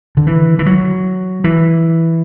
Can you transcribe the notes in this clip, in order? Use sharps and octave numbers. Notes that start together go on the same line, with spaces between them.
D3
E3
E3
F#3
E3